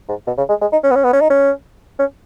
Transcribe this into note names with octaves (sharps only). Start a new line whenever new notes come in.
G#2
B2
C#3
G#3
G#3
D#4
C#4
B3
C#4
B3
C#4
D#4
C#4
C#4